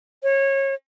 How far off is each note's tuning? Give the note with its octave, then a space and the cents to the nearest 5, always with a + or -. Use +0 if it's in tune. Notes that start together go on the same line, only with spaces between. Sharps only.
C#5 -25